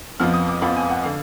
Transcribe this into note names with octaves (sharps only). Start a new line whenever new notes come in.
F2 F3 B3 F6
D#6
D6
F2 F3 B3 B5
G#5
F#5
D3 F5